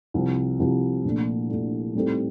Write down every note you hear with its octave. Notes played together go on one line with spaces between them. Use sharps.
C2 C3 F3 C4
C2 C3 F3 C4
A#1 A#2 A3 D4
A#1 A#2 A3 D4
A2 G3 C4 D#4 A4